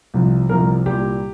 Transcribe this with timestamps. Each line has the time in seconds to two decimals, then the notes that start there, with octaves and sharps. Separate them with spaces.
0.14 C2 C3 F3
0.49 C2 C3 F3 A#4
0.86 C2 A#2 G3 G4